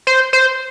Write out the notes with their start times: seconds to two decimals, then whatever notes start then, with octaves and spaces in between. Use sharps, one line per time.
0.07 C5
0.33 C5